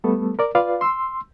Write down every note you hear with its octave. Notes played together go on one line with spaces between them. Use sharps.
G3 A3 B3 A4
A#4 D5
F4 B4 D5 F5
C6 E6